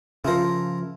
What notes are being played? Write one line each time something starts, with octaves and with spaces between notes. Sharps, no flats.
C#3 F3 E4 F4 A#4